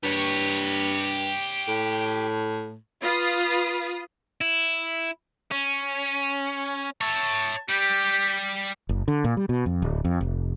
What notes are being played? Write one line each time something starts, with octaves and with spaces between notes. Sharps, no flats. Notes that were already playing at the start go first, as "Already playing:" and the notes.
G2 G4 C#5
A2
F4 B4 D#6
E4
C#4
C#5 E5 A5
G3 G4
F#1
D3
A#2
G3
B2
F2
D1
F2
F1